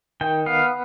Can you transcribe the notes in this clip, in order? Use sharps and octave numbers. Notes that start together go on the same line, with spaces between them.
D#3 G5
B3 F5